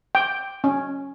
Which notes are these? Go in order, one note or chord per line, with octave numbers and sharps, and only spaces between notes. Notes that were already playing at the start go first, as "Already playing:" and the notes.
G5
C#4